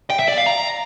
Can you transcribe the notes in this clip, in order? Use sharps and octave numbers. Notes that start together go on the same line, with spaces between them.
G5
E5
D5
F5
A#5